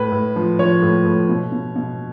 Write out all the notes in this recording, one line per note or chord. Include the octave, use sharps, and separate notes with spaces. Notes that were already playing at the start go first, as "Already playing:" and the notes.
Already playing: A2 B4
A2
F3
F3 C#5
A2
A2
B2
B2
B2